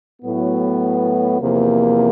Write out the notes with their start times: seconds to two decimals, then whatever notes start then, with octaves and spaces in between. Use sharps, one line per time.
0.22 A2 F#3 B3
1.41 E2 C3 F3 A#3